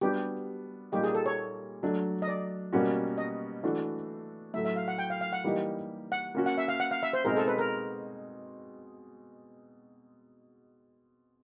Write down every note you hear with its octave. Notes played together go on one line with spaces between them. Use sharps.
G3 B3 D4 F#4 G4
A#2 G3 A#3 D#4 G4
G#4
A4
C#5
F#3 A3 D4
D#5
D5
B2 G3 A#3 C#4 F#4
D#5
E3 A3 D4 F#4
A2 F#3 A3 E5
E5
F5
F#5
G5
F5
F5
F#5
E3 G3 A#3 D#4 G4
F#5
A#3 C#4 F#4
F#5
E5
F5
F#5
F5
E5
C5
B2 G#3 C4 D#4 G#4 A#4
A4
B4
A#4